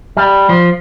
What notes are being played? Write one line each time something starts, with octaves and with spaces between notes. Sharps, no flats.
G3
F3